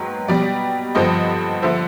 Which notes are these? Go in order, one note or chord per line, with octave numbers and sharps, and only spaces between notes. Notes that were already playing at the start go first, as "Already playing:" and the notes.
Already playing: G#2 D#3 F#3 B4
B2 G3 D5
G2 D3 F3 D#5
D3 F3 E5